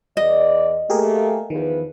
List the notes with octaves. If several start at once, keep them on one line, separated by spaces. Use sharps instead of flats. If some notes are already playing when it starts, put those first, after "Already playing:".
E2 D5 D#5
A3 A#3 G4 G#4 A#4
E2 D#3 F3 B4